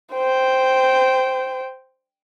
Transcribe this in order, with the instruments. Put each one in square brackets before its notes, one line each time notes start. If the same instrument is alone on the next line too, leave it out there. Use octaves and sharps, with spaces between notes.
[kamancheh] C5 G5